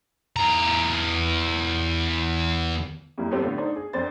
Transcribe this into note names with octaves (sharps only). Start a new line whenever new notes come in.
E2 A#5
F2 G3 A#3 E4
G3 B3 C4 G4 A4
A2 D3 A3 B3 F4
D4 D#4 C5
G#4
F2 D4 C5 A6